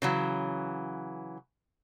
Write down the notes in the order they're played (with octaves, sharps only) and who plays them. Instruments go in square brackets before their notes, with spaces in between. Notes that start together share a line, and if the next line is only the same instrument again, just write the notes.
[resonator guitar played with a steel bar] C#3 E3 F#3